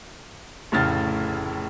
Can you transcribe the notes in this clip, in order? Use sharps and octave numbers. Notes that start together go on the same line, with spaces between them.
F1 A2 C#3 F6 A6